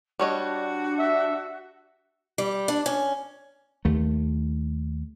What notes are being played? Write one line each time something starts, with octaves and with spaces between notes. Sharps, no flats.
G3 D4 F#4 C#5 D#5
E5
G3
D4
C#4
D#2 A3